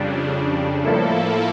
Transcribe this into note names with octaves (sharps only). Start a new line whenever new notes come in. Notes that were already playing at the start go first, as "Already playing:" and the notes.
Already playing: F2 C#3 G3 D4
A2 F3 A#3 E4 A4